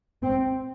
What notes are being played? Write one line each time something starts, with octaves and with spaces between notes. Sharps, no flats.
C4